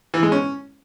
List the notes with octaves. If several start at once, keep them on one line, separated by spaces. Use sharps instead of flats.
E3
G#3
C#4